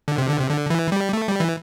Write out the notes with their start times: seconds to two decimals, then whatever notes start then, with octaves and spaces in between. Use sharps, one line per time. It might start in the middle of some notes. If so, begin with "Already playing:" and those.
0.08 D3
0.18 C3
0.29 D3
0.39 C3
0.49 D3
0.70 E3
0.92 G3
1.13 A3
1.27 G3
1.40 E3